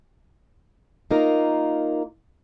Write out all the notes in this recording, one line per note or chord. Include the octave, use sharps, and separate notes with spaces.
A#3 D#4 F4 A#4